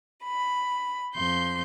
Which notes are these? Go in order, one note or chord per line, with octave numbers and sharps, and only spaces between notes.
B5
F2 C6 G6